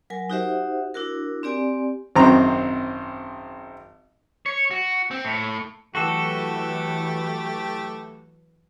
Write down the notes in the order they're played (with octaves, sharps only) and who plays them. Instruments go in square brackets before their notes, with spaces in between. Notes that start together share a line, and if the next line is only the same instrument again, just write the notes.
[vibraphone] F#3 A#4 G#5
D#4 F#4 G4 C5 E5 F#5
D4 E4 F#4 A#4
C4 G4 D5 G#5
[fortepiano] G#1 F#2 C4 A#5
[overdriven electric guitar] C#5
F#4
C4
A2
[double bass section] E3 F#3 [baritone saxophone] A3 [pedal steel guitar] F#4 A4 [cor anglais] G4